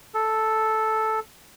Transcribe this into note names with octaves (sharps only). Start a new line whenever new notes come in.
A4